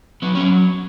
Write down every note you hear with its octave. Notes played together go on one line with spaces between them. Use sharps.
F#3 B3
F#3 C#4